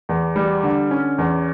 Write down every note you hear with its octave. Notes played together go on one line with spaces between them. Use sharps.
E2
G3
D3
C#4
E2